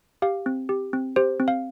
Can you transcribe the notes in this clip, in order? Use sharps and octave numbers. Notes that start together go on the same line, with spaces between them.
G4 F5
C4
G4
C4
G4 C5
C4
F5